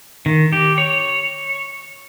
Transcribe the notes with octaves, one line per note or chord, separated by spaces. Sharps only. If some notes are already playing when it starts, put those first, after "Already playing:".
D#3
G4
C#5